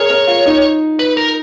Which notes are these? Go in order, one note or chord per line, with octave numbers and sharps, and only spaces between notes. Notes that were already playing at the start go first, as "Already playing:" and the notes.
Already playing: G#4 A#4 C#5
A#4
F4
D#4
B4
A#4